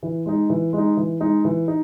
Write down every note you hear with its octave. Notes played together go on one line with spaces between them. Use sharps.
E3
G#3 D#4
E3
G#3 D#4
E3
G#3 D#4
E3
D#4